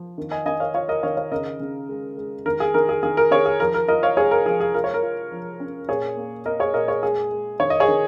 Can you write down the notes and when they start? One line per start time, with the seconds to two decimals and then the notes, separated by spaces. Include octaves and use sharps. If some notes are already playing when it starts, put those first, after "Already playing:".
Already playing: F3
0.18 D#3
0.31 D#5 G#5
0.46 D#3 D#5 G#5
0.60 C#5 F5
0.75 F4 C#5 F5
0.88 A#4 D#5
1.03 D#3 C#5 F5
1.17 C#5 F5
1.32 C#3 A#4 D#5
1.60 C#3
1.89 G#3
2.17 G#3
2.46 D#3 A#4
2.60 G#4
2.74 D#3 A#4
2.89 G#4
3.03 D#3 G#4
3.17 A#4
3.31 D#3 G#4 C#5
3.46 G#4
3.60 F3 A#4
3.74 A#4
3.88 F4 A#4 D#5
4.03 C#5 F5
4.17 G#3 G#4 C#5
4.31 A#4
4.46 F3 G#4
4.60 G#4
4.74 F4 A#4
4.84 C#5
4.94 A#4
5.03 F4
5.32 F3
5.60 C#4
5.89 A#2 G#4 C#5
6.17 A#3
6.46 A#3 A#4 D#5
6.60 G#4 C#5
6.74 A#2 A#4 D#5
6.88 G#4 C#5
7.03 G#3 G#4
7.31 G#3
7.60 D#3 C#5
7.70 D#5
7.80 G#4 C#5
7.88 D#3